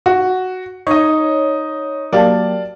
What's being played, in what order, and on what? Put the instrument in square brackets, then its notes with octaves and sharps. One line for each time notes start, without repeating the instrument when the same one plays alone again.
[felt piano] F#4
[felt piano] D#4 D#5 [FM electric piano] C#5
[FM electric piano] F#3 A#3 G4 [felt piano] D5 F5 A5